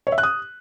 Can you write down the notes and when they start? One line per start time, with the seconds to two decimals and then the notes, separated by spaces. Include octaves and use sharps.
0.07 C#5
0.12 E5
0.18 F#6
0.23 D#6